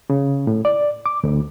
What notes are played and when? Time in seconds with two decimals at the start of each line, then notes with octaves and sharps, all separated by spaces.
0.10 C#3
0.47 A2
0.65 D5
1.06 D6
1.24 D2